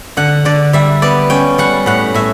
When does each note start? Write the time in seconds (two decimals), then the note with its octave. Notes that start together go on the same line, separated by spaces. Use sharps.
0.17 D3 F#5
0.45 D3 D5
0.73 G3 E5
1.02 B3 D5
1.30 C#4 G5
1.58 G3 F#5
1.86 A2 F#5
2.14 A2 E5